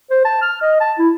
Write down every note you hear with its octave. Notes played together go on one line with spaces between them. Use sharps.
C5
A5
F6
D#5
A5
E4